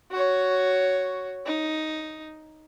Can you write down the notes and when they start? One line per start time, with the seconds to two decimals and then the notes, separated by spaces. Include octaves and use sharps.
0.11 F#4 C#5
1.46 D#4